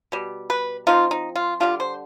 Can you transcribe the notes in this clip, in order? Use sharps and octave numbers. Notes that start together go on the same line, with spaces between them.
B2 G3
B4
F3 C4 D#4 F4
D#4
F4
D3 G3 D4 F4
C5